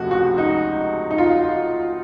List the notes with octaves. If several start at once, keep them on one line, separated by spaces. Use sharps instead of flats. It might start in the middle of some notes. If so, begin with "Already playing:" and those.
Already playing: C#2 C3 F3 A3 F#4
F#4
D#4
D#4
F4